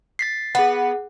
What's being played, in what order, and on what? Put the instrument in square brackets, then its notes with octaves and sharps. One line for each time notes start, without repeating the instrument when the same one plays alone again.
[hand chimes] A6 B6 C7
[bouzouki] B3 [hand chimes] G#4 F#5